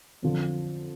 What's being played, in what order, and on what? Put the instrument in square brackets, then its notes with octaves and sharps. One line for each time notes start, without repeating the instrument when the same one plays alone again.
[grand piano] F2 D3 F3